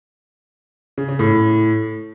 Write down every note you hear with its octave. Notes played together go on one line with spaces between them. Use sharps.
C#3
C#3
A2